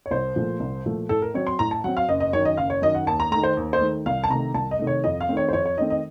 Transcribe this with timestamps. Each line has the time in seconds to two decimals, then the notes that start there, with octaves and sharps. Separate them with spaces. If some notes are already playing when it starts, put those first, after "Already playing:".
0.06 C#5
0.11 C2 C5
0.36 A#2 F3 A3
0.60 C2
0.86 A#2 F3 A3
1.09 A2 A4
1.22 A#4
1.34 F#3 C4 C#5
1.47 C6
1.59 A2 A#5
1.71 A5
1.84 F#3 C4 F#5
1.97 F5
2.09 F#1 D#5
2.20 D#5
2.33 F#2 D#3 C#5
2.45 D#5
2.57 F#1 F5
2.70 C#5
2.82 F#2 D#3 D#5
2.95 F#5
3.07 D#2 A5
3.20 A#5
3.31 D#3 A3 A#5
3.43 C5
3.57 D#2
3.73 C5
3.81 D#3 A3
4.06 C2 F5
4.24 A5
4.30 C3 D#3 A3 A#5
4.54 C2 A5
4.71 D#5
4.79 C3 D#3 A3
4.87 C#5
5.04 F2 D#5
5.21 F5
5.29 D#3 A3 C4
5.37 C#5
5.49 C5
5.53 F2 C#5
5.66 C#5
5.78 D#3 A3 C4 D#5
5.90 D#5